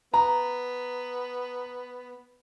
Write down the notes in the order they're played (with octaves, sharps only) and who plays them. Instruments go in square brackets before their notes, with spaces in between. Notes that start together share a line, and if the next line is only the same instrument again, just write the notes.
[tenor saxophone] B3 [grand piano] A#5